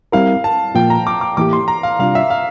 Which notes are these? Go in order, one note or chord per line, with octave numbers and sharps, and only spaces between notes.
G3 C4 E4 A#4 F5
A5
A#2 F3 A#3 F4 G5
A#5
D6
D6
A2 E3 A#3 E4 G4 D6
C6
A#5
F5
C3 G3 D4 F4 F5
E5
F5